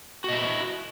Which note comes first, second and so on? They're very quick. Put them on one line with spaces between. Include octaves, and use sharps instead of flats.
F#4 D#5 E4